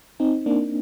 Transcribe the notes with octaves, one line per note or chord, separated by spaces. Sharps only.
C4 D#4
A#3 D4